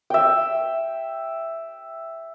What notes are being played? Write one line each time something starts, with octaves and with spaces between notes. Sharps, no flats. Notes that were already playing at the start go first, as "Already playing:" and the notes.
E5 G5